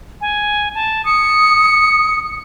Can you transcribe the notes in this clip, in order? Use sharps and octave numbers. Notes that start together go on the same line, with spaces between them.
G#5
A5
D#6 C#7